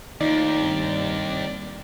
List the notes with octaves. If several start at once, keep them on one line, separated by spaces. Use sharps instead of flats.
D#2 A2 D#4 F4 D5
G2 C3